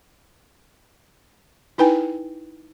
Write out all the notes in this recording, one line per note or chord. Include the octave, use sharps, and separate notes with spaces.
D#4 E4 B4 G5 G#5